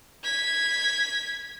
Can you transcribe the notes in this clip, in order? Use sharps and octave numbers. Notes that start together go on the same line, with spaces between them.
G#6 B6